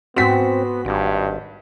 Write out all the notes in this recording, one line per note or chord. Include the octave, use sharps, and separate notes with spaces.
G#2 B3 C4 F#4 F#5 C6 B6
G#1 G2